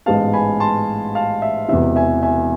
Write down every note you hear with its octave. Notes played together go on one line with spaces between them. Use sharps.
A1 G#2 G#3 B3 F5 A5
G#5 B5
A5 C6
F5 A5
E5
E1 E2 C3 E3 E5
E5 G#5
E5 G#5